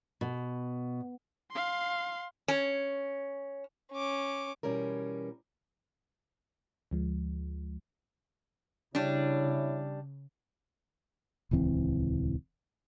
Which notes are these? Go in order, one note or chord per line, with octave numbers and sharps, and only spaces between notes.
B2
F5 C6
C#4
C#4 D6
B2 E3 G3 C#4 A#4
D2 F3 G#3
C#3 G3 D4 E4 C#5
D#1 C#2 E3 C4